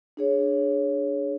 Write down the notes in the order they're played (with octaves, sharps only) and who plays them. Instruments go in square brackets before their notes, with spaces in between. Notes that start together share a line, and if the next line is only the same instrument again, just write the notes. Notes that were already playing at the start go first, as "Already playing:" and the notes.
[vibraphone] D4 G#4 C#5